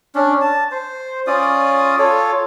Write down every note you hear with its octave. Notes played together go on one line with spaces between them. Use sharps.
C#4 D4
A5
C5
C#4 F4 D5 D#6
F4 A4 C#5